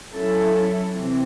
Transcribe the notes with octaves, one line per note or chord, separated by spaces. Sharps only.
F#3 C#4 E4 A4
C3 E3 C4